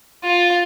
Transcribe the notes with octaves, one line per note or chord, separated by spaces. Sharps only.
F4